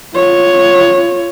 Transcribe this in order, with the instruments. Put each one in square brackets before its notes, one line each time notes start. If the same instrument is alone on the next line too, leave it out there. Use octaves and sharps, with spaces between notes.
[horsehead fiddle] F4 C#5